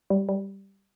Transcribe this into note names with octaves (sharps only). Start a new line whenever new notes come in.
G3
G3